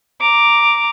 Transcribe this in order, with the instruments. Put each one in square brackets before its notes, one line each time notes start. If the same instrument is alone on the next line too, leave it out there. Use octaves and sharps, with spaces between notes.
[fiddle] A#5 D6